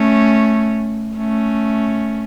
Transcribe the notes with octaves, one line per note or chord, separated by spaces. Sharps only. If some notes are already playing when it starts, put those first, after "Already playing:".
Already playing: A3 C#4
A3 C#4